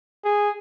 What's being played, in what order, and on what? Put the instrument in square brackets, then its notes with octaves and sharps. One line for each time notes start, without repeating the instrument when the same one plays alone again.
[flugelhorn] G#4